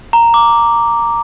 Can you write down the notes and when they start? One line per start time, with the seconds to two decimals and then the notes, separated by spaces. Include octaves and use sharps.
0.13 A#5
0.34 D6